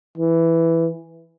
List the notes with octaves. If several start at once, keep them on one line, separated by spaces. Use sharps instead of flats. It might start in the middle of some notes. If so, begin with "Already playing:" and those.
E3